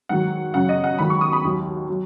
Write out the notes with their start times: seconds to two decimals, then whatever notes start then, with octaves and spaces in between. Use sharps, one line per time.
0.09 G#2 D#3 F#3 F#5
0.54 F#2 C#3 F#3 F#5
0.69 D#5
0.84 F#5
0.99 G#2 D#3 F#3 B5
1.10 C#6
1.21 D#6
1.33 B5
1.44 D#2 D#3 F#3
1.89 F#3